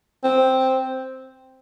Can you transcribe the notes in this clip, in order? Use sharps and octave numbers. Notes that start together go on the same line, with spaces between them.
C4